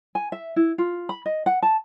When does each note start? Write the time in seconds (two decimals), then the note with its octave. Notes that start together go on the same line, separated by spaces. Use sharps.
0.15 G#5
0.32 E5
0.56 E4
0.78 F4
1.09 B5
1.26 D#5
1.46 F#5
1.63 A5